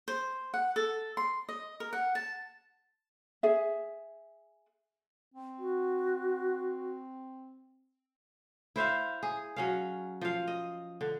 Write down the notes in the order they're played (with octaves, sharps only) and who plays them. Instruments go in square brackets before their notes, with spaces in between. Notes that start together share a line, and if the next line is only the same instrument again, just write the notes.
[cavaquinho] C5
F#5
A4
C6
D#5
A#4
F#5
A5
[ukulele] G#4 E5
[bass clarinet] C4
[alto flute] F#4
[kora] E4 C5 E5 F5
G#4
F#3 C#4 F5
F3 F5
D#5
D3